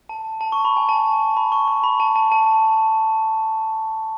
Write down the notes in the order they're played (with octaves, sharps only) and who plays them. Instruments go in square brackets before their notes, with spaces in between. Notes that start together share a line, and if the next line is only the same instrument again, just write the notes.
[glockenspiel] A5
A5
C#6
B5
G#5
A5
B5
C#6
C#6
B5
A5
A5
A5